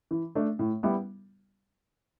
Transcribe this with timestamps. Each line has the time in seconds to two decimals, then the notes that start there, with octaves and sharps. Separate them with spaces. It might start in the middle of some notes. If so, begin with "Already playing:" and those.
0.11 E3
0.35 A3 D4
0.59 A2
0.83 G3 B3 E4